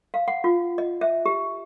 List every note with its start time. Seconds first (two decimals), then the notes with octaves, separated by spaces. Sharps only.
0.14 F5
0.28 F#5
0.44 F4
0.78 D#5
1.01 E5
1.26 G4